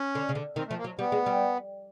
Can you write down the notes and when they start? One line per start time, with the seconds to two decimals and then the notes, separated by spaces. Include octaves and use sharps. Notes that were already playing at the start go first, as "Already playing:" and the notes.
Already playing: C#4
0.15 D3
0.29 C#3
0.35 D3
0.56 D#3 C4
0.67 A3
0.71 F3
0.78 A#3
0.84 F#3
0.99 G3 B3
1.12 G#3
1.26 G3